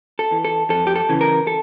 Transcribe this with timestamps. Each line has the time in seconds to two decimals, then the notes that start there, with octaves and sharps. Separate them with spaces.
0.19 A4
0.32 E3
0.45 A4
0.70 F2 A4
0.87 G4
0.96 A4
1.09 C#3 E3
1.21 A#4
1.47 A4